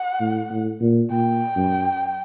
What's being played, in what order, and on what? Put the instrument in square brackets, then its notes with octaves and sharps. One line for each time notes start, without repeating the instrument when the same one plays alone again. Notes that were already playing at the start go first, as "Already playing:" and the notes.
Already playing: [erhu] F#5
[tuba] A2
A2
A#2
[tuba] A#2 [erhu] G5
[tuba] F#2